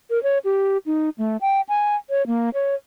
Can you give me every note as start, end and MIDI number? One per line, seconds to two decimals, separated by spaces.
0.10 0.21 70
0.23 0.38 73
0.45 0.78 67
0.86 1.09 63
1.18 1.37 57
1.41 1.61 79
1.69 1.96 80
2.10 2.25 73
2.27 2.50 58
2.54 2.75 73